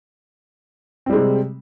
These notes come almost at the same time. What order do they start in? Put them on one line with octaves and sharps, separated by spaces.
C4 G3 G#3 C3